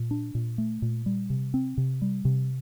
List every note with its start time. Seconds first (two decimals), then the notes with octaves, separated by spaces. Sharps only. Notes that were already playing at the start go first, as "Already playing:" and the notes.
Already playing: A#2
0.11 D4
0.35 A#2
0.58 A3
0.82 A#2
1.06 G3
1.30 C3
1.54 C4
1.77 C3
2.02 G3
2.25 C3